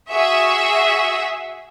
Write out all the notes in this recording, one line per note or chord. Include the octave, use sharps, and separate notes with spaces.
F#4 G#4 E5